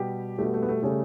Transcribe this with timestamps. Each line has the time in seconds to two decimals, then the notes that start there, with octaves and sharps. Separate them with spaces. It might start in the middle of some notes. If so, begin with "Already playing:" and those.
Already playing: B2 G3 G4
0.38 B2 G3 A3
0.54 A3
0.62 B3
0.68 A3
0.83 C#3 G3 A3